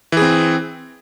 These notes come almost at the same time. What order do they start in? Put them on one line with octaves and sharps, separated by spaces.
E3 G#4 C4